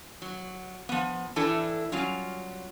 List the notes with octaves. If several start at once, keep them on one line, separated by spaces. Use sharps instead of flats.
F#3
F3 B3
A2 E3 A3 D4 E4 A4
F#3 G3 C#4 F4